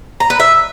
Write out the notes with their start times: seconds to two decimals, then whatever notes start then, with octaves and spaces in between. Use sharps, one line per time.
0.20 A#5
0.30 B4
0.40 E5